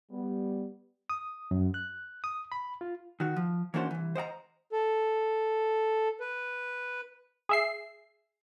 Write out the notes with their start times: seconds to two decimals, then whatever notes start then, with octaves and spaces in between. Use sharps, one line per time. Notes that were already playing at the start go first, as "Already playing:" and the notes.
0.11 G3 B3
1.10 D#6
1.51 F#2
1.74 F#6
2.24 D#6
2.52 B5
2.81 F4
3.20 D#3 F#4
3.36 F3
3.74 E3 A#3 C#4 D4 F#4 C5
3.91 C2 E3
4.15 C5 D#5 F#5 A#5
4.72 A4
6.20 B4
7.49 G#4 E5 C7